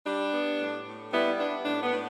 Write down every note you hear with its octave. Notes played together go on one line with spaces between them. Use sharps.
G3 D4
B3
A2
A2
G3 B3 E4
B3 D4
A2 D4
B3
A2